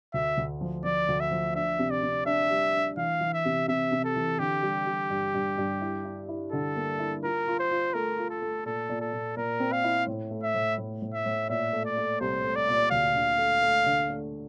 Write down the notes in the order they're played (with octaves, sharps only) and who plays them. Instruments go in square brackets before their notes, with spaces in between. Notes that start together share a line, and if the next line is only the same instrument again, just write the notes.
[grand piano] D2 [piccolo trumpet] E5
[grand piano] D2
F3
[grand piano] F3 [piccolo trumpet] D5
[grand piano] D2
[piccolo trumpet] E5
[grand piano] F3
[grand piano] D4 [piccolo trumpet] E5
[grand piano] C3
[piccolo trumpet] D5
[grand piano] C3
[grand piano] D4 [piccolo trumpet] E5
[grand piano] G3
D4
[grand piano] E3 [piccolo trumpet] F5
[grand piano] E3
[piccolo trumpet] E5
[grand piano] C3
[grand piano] C3 [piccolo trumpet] E5
[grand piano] C3
[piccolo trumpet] A4
[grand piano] E3
[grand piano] D3 [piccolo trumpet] G4
[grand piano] G3
G3
G2
G2
G2
E4
E4
E4
[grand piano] D3 [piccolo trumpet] A4
[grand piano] A#3
E4
[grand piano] F4 [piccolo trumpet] A#4
[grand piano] F4
[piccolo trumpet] C5
[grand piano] F4
[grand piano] A3 [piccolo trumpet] A#4
[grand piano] F4
[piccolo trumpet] A4
[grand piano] A3
[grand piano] A#2 [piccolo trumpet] A4
[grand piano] A#2
[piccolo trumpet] A4
[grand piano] A#2
[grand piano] A#2 [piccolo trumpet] A#4
[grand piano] C4
[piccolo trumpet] F5
[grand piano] E4
A2
A3
[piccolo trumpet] E5
[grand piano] A2
A2
A2
[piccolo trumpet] E5
[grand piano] A2
[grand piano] A#2 [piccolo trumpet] E5
[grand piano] A3
[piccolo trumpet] D5
[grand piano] A3
[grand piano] C2 [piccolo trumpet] C5
[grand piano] A3
[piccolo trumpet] D5
[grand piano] A#2
[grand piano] D2 [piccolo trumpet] F5
[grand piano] D3
A3
A3
D3
A3